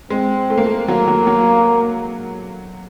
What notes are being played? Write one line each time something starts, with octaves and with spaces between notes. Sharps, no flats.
G#3 C4
A3
A#3
A3
F#3 A#3
F#3
F#3